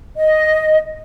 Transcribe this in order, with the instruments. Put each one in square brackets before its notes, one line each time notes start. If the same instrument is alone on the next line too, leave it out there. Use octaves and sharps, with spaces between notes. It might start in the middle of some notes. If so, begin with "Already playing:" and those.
[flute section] D#5